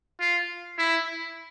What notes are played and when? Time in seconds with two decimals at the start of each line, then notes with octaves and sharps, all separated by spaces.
0.20 F4
0.78 E4